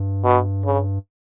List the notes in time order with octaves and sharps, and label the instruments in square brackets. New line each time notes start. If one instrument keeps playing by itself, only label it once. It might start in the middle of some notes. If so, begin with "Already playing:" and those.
Already playing: [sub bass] G2
[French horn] B2
C#3